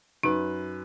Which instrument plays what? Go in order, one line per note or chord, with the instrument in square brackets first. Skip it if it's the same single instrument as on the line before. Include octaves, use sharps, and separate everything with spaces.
[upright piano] F#2 B4 [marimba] D#4